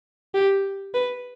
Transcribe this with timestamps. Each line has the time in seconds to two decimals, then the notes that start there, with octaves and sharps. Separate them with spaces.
0.34 G4
0.94 B4